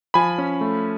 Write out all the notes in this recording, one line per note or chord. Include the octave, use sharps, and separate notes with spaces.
F3 G#5 B5
C#4
A3